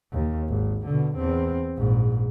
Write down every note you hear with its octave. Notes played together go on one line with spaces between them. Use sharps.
D#2
G#1
B2 D3
E2 C4
A#1 G#2